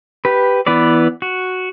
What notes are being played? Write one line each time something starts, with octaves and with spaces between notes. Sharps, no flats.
G4 B4
E3 B3 B4 D5
F#4